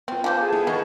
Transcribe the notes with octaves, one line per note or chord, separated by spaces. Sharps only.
B3 C4 F4
E3 F3 A5 D6 G6
G#4 A4 A5
B3 E4
D#3 B3 D#5 C#6